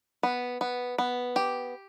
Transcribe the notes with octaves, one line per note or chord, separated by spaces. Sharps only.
B3
B3
B3
G4